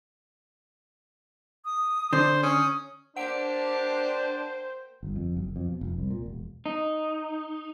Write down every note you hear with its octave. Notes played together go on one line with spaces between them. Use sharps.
D#6
D3 C5
C#4 D#6
A#3 D4 G4 C5 F#5 D7
G1
F2
F#1
F2
B2
F1
C2
A#2
E1
D#4